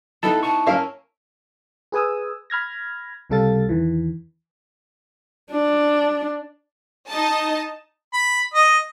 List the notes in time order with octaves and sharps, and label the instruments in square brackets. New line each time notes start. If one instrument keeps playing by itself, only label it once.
[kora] B3 D#4 E4 [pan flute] A4 [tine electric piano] A5
[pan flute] A5 [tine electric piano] C#6
[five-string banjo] A#3 F5 [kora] C#4 A#4 E5
[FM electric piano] G#4 B4 G#5 D#6 E6
B5 F6 G#6 A#6
C#2 C3 G3 A4 F5 A6
E2 D#3 E3
[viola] D4
[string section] D#4 D#5 A5
[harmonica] B5
D#5